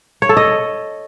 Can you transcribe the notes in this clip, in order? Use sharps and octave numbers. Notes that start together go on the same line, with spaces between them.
C#5
A4
D#5